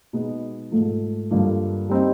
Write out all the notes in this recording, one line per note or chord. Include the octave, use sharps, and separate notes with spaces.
B2 G#3 B3 D#4
G#2 F3 A3
G2 D3 F3 A#3
G3 C4 D#4